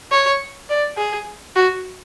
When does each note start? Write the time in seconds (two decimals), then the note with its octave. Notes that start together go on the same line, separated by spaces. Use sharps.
0.11 C#5
0.69 D5
0.97 G#4
1.56 F#4